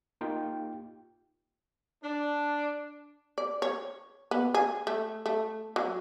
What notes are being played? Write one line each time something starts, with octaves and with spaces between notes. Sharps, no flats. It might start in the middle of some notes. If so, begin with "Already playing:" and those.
A#3 D#4 F4 G4 G5
D4
D5
C#5
B3
G#4
A3
A3
F#3